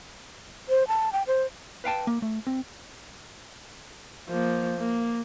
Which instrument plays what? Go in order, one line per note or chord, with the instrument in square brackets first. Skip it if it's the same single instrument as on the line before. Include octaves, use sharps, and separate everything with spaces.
[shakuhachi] C5
A5
G5
C5
[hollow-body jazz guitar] B4 F5 G5 A5
A#3
A3
C4
[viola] F3 A#3
A#3